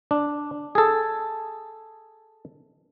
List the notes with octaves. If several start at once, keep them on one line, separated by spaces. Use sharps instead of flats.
D4
G#4 A4